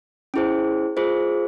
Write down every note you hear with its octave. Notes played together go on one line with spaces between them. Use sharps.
C#4 E4 G#4 C5
F4 G#4 C5